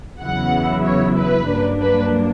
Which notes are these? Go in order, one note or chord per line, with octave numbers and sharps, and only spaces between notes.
E2 C#3 F#3 B3 E4 F#5
C#5
B4
G2 F#3 A#3 D4
B4